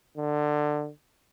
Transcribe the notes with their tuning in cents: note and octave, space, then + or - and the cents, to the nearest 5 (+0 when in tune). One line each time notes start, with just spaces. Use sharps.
D3 +20